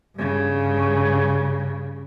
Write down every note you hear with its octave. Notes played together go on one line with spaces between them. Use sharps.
G2 C#3